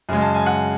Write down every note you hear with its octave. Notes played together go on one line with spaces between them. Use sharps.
F#2 C#3 G#3 G#5
A5
G#5
F#5